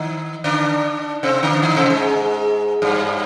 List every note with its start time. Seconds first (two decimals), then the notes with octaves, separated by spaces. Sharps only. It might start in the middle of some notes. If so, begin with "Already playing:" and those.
Already playing: D#3 D#4
0.44 D3 D4
1.23 C3 C4
1.43 D3 D4
1.62 D#3 D#4
1.76 C3 C4
1.90 G#2 G#3
2.82 G2 G3